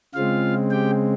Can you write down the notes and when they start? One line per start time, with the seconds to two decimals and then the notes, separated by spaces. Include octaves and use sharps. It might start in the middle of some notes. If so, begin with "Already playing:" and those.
0.14 C#3 G#3 C4 F4 F5
0.71 G4 G5